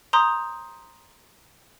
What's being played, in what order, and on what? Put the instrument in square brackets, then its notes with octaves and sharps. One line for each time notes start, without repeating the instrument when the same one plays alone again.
[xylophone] A#5 C6 D#6 G6